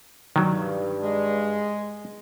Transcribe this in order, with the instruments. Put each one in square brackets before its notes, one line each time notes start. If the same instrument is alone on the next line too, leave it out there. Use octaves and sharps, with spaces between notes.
[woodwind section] G2 [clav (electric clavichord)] D#3 F#3
[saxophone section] G#3